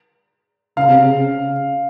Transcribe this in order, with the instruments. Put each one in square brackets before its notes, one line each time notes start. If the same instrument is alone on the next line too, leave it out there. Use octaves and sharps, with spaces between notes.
[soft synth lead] C#3 [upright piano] F5
[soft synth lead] C3
C#3